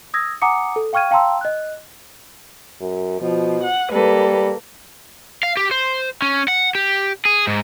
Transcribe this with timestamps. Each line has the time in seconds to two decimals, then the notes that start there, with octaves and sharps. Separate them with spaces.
0.14 D#6 E6 G#6 A#6
0.42 F#5 G#5 A#5 D6 D#6 C#7
0.76 A4
0.93 F5 G5 C#6 F6 G#6 D#7
1.11 F5 G5 A5 A#5 C6 E6
1.41 D#5 F#6
2.81 F#2
3.21 B2 F3
3.63 F#5
3.92 G3 A#3 A4 B4
5.43 F5
5.57 G4
5.71 C5
6.22 C#4
6.48 F#5
6.75 G4
7.25 G#4
7.47 G#2